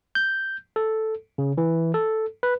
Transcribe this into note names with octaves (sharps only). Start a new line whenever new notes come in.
G6
A4
C#3
E3
A4
B4